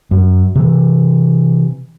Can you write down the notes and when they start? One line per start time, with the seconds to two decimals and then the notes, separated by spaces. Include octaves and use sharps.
0.11 F#2
0.55 C3 E3